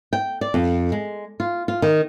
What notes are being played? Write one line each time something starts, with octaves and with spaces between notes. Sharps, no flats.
G5
D5
F2
G#3
F4
F4
D#3